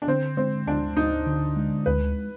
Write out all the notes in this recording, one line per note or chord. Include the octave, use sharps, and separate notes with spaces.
D4
D3 C4
G#3 C4
D2 D4
D2 D#4
D3
G#3
D2 B4